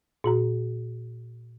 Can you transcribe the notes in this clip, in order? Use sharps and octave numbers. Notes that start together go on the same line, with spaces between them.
A#2 F#4 A#5